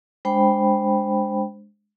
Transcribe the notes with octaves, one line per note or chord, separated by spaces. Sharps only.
G#3 D4 C5 G5 B5